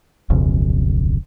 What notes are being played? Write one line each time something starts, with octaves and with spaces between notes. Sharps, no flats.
D1 B1 F2 C#3